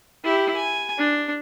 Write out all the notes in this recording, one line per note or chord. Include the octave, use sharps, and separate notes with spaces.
E4 G4
G#5
D4